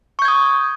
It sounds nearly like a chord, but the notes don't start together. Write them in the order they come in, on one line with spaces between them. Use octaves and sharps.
C#6 G6 G#6 D#6